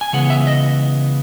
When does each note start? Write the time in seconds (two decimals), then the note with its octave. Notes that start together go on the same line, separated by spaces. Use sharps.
0.01 G#5
0.13 C#3 E3 G#3 B3 F#5
0.30 E5
0.47 D#5